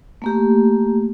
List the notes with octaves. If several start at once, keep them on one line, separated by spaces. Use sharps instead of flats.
A3 A#3 G4